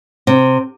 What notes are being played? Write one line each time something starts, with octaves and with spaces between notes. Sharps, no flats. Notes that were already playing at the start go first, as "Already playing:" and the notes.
C3